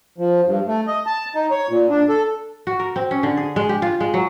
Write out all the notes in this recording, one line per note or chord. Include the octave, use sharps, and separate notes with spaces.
F3
G2
A3
D#5
A5
D#4
C#5
A#2
D4
A4
F#4
A#4
C4
C#4
D3
G#4
G#3
G4
F4
G#3
F#3